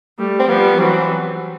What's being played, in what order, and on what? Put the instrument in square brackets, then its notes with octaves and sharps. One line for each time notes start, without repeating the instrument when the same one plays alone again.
[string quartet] G3 A3
[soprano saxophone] C4
[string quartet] F3 G3 [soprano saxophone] B3
[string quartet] E3 F#3 [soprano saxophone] C4